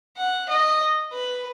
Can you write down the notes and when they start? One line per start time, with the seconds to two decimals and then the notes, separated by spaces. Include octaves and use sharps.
0.17 F#5
0.49 D#5
1.13 B4